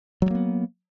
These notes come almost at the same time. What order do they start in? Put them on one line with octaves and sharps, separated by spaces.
F#3 G3 A#3 B3